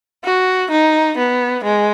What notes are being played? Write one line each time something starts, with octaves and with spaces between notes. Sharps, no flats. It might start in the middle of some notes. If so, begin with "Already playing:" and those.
F#4
D#4
B3
G#3